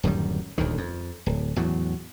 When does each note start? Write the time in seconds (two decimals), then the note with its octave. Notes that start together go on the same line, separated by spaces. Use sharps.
0.03 D1 F#2 D#3 G3
0.58 D#1 D2 D#3
0.78 F2
1.26 D1
1.56 E2 A2 F#3